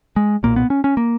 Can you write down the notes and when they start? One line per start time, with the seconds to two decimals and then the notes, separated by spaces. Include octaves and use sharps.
0.16 G#3
0.43 B1 A#2 A#3
0.56 B3
0.70 C#4
0.84 C#4
0.97 A#3